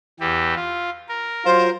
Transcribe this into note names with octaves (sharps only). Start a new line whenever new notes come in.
E2 E3 G4
F4
A#4
F#3 F4 C5